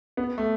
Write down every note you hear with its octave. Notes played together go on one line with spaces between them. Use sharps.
B3
A3